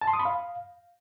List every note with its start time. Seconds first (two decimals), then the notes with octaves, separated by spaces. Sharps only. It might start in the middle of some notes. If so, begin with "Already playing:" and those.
0.01 A5
0.07 C6
0.13 D#6
0.19 B5
0.25 F5